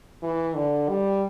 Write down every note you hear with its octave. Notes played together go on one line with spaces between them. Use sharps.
E3
D3
G3